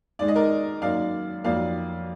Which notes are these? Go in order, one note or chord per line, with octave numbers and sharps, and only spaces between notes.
G#2 D#3 G#3 D5
D#5
A#4 D5
F#2 D#3 A#3 D5 F5
F2 D#3 F#3 A#3 D5 F5